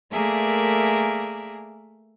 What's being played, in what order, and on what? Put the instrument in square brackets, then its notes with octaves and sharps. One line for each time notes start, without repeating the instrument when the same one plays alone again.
[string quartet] A3 A#3 G#4 A#4 D5 E5